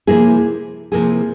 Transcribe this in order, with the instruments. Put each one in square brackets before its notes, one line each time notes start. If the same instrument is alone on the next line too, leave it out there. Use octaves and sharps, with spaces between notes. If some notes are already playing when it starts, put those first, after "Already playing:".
[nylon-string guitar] C3 F3 A#3 E4 G#4
C3 F3 A#3 E4 G#4